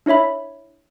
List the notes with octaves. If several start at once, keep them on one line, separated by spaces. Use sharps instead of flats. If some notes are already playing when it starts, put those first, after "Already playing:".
D4 E4 C#5 E5 B5